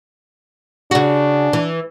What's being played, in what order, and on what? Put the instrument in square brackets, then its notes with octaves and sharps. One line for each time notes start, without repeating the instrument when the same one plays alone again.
[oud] C#3 F#4 [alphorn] D4
[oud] E3